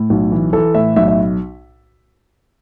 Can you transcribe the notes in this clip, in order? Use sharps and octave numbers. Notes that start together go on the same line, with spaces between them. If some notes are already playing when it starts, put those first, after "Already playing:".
Already playing: A2
B1
E3
E3 A4
A2 E5
B1 E5
E5